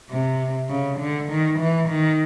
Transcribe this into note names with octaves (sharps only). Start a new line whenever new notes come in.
C3
C#3
D3
D#3
E3
D#3